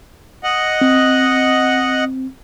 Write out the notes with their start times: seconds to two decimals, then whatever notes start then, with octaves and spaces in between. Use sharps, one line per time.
0.44 D#5 F#5
0.81 C4